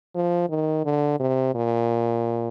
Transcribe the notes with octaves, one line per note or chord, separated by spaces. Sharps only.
F3
D#3
D3
C3
A#2